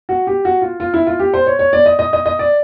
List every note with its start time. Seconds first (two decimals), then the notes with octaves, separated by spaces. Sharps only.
0.09 F#4
0.27 G4
0.45 F#4
0.62 F4
0.80 F4
0.94 E4
1.07 F4
1.19 G4
1.34 C5
1.46 C#5
1.59 C#5
1.73 D5
1.86 D#5
1.99 D#5
2.13 D#5
2.26 D#5
2.39 D5